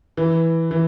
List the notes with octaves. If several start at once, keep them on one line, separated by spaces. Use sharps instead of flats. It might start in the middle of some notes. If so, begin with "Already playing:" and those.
E3
E3